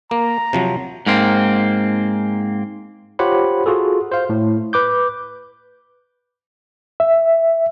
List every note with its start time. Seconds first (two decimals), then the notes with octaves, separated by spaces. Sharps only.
0.11 A#3 A#5
0.53 C3 F3 F#3
1.06 G#2 A#3 C4
3.19 F4 G4 C5 C#5 F#5 B5
3.66 F4 F#4 G#4 A4
4.12 C5 F5
4.29 A2
4.73 B4 D6 G6
7.00 E5